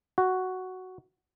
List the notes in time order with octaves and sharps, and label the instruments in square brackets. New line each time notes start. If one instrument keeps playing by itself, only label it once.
[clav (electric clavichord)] F#4